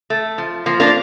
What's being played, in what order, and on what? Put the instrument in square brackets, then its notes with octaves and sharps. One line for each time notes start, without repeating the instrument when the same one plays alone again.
[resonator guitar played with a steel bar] A3
F3
F3 A#3
A#3 D4